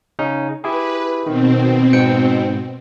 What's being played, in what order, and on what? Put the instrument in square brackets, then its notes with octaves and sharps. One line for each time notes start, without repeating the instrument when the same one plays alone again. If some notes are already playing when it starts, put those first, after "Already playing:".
[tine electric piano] C#3 C#4 D#4
[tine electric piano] E4 G4 G#4 [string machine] B4
[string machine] B2 C4 [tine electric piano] D#3
[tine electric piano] G#2 G5 C#7